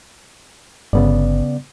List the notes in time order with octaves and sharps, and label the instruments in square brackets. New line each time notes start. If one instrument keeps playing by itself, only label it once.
[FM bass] G1 [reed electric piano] C#3 B3 D5